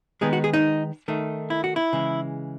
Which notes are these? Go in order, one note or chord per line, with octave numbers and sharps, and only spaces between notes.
D#3 G#3 B3 D#4 G#4
F#4
G#4
D#4
D#3 A3 D#4
E4
F#4
E4
C#3 E3 G#3